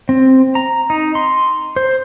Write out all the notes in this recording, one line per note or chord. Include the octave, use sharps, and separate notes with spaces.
C4
A#5
D#4
C6
C5